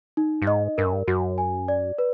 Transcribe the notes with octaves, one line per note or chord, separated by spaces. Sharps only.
D#4
G2
G#2 D#5
G2 A#4
F#2
G2
F#2 F#4
G#5
D5
B4